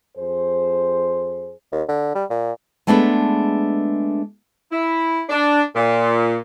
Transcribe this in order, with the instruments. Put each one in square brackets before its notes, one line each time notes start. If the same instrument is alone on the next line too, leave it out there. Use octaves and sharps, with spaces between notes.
[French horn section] F2 G#4 C5
[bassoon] D#2
D3
G3
A#2
[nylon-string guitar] G#3 A3 B3 D4 G#4 B4
[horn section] E4
D4
A#2